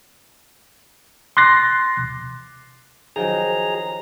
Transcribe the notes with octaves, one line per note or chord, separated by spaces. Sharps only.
C6 D6 F#6 A6 A#6 C7
D#3 F3 F#3 G#4 A#5